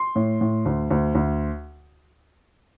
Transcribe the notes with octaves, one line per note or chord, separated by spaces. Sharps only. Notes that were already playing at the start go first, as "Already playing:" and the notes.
Already playing: C6
A2
A2
D2
D2
D2